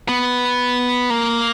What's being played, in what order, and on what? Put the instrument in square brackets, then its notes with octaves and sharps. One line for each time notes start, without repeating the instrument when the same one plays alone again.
[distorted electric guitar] B3
A#3